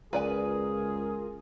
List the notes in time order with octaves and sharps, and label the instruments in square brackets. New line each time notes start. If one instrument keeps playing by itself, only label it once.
[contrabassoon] C#2 [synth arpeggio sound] F4 A#4 [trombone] G#4 [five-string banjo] B4 D5 G#5